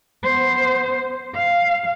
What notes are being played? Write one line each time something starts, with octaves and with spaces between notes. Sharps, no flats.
B3 C5
F5